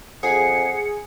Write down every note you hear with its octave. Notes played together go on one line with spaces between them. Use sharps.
F2 G#4 F#5 G#5 C7 C#7